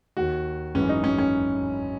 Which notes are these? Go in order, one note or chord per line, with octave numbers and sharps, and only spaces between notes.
D#2 D#3 F#4
G#1 F#2 E3 C#4
D#4
C#4
C#4